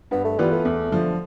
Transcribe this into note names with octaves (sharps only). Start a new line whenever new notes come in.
G2 B3
A3
E3 G3 B3 F4 B4
A3
E2
D3 F3